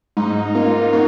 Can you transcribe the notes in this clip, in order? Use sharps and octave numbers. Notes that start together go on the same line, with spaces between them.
G#2 D#4
A#3 F4
A#3 F#4